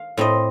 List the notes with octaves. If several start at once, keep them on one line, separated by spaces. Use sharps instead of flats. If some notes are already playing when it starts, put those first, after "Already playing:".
Already playing: F5
A2 A3 C4 D#5